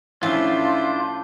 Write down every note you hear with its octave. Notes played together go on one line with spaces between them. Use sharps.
A2 F3 C#4 D4 E4 F4 G6